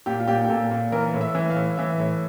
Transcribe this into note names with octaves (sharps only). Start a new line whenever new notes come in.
A#2 G4
F4
A#2 G4
G4
A#2 A4
A#2
E3 A#4
A2
E5
E3
F5
A2
E3 E5
A2